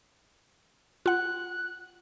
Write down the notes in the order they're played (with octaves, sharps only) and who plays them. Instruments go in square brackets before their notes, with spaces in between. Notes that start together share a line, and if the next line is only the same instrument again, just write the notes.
[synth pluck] F4 F#5 [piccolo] F#6